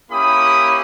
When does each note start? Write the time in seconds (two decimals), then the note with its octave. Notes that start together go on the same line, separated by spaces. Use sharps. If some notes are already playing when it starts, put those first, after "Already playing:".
0.11 A#3 C#4 E4 G4 B5 D#6